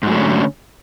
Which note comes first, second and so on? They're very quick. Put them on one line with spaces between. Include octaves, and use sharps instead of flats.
G#2 F#3 A3 D3 C#4